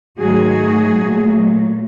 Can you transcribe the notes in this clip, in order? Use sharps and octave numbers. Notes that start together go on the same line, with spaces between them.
G#2 D#3 F#3 A3 F#4 G#4
A#2 F#3 A3